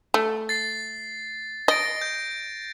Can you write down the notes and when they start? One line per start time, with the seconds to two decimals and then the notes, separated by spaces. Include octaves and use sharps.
0.14 A3
0.49 A6 C7
1.68 D#5 A6 A#6 D7
2.02 G6